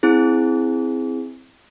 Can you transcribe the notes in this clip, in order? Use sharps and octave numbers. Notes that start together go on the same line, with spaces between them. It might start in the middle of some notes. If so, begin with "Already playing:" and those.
C4 E4 G#4